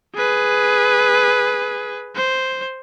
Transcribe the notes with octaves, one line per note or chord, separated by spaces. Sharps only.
G#4 B4
C5